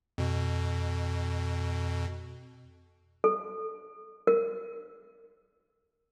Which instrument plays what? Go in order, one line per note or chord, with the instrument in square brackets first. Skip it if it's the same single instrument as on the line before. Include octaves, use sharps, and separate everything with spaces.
[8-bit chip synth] F2 B2
[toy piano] A4
A#4